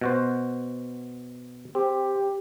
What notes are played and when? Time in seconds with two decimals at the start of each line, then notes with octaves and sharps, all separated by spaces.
0.01 B2 F#4 C5
1.75 C4 G4